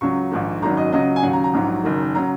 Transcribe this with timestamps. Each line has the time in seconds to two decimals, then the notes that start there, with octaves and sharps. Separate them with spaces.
0.01 C#2 C#3 F#3 C#6
0.32 A#1 G#2 D#3
0.62 G#1 F#2 D#3 F#3 A#5
0.77 D#5
0.93 C#2 C#3 F#3 D#5
1.16 G#5
1.23 D#2 C#3 F#3 F#5
1.33 A#5
1.44 A#5
1.54 A#1 G#2 F#3
1.84 F#1 F#2 D#3
2.15 C#3 F#3 A#5